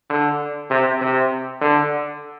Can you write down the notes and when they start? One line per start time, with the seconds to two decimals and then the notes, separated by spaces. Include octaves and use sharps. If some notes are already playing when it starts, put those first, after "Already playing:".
0.10 D3
0.70 C3
1.01 C3
1.61 D3